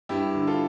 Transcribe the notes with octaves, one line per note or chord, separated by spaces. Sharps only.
G2 E4 G4
D3
F4 A4